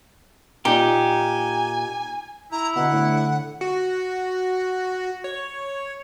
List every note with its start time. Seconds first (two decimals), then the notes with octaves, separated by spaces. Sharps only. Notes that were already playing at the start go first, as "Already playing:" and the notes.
0.65 A#2 D#4 G4 G#5
2.52 E4 A#5
2.76 B2 D3 F#5
2.92 A2
3.61 F#4
5.24 C#5